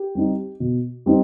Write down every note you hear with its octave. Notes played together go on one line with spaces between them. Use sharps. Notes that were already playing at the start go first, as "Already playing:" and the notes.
Already playing: G4
G3 C4 D#4
B2
G3 C4 D#4